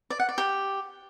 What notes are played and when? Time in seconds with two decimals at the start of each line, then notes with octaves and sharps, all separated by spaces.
0.10 D5
0.20 F#5
0.29 D5
0.38 G4